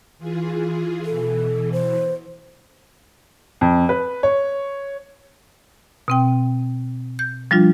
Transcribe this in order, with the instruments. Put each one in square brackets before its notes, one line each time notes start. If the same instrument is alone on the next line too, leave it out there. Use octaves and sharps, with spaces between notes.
[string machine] E3 F4 G#4
[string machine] B2 E3 [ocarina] A4
[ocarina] C5
[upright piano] F2
B4
C#5
[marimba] B2 C4 G5
G6
F3 G3 D4 F4